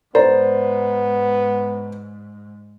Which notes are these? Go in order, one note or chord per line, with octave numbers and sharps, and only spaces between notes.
G#2 B3 C5 D5 A#5